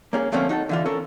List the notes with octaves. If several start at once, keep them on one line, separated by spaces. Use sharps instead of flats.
A#3 C#4 G#4
D3 F3 A3 A#3 C4 C#4
D#4 F#4 G4 A4
D3 E3 F4
C#4 A4 A#4